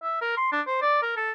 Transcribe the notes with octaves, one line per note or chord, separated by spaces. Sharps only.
E5
A#4
C6
D4
C5
D5
A#4
A4